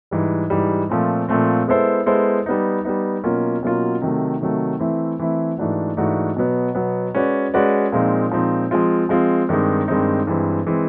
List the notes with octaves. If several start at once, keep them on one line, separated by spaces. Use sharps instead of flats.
G#2 E3 G3
G#2 E3 G3
A#2 F3 A3 C4
A#2 F3 A3 C4
G#3 B3 E4 A4 C5
G#3 B3 E4 A4 C5
G3 B3 D#4
G3 B3 D#4
B2 F#3 A#3 C#4 F4
B2 F#3 A#3 C#4 F4
C3 D#3 F#3 A3
C3 D#3 F#3 A3
E3 A3 C4 E4
E3 A3 C4 E4
G#2 E3 A3 D4 F#4
G#2 E3 A3 D4 F#4
B2 F#3 B3
B2 F#3 B3
G#3 C#4 F#4 B4 D5
G#3 C#4 F#4 B4 D5
A#2 F3 G#3 C4 D#4
A#2 F3 G#3 C4 D#4
F3 G#3 C4 F4
F3 G#3 C4 F4
G2 D#3 G#3 C4 D#4
G2 D#3 G#3 C4 D#4
G2 E3 G#3 C4
E3 G#3 C4